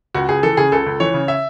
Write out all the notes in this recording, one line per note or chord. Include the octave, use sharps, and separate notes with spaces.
C#2 F#4
C#2 G#4
E3 A4
C#3 G#4
C#2 A4
C#2
E3 C#5
C#3
E5